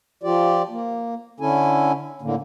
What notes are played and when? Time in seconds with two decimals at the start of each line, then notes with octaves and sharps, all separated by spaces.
0.23 F3 F4 G4 D5
0.69 A#3
1.40 D3 C#4 E4 A4 G#5
2.22 A2 D3 A#3